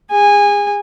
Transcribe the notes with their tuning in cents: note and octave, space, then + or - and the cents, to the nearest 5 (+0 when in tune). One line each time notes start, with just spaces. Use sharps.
G#4 -30 G#5 -20